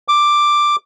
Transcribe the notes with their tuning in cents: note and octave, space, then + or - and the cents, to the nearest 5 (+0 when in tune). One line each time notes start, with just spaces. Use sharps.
D6 +5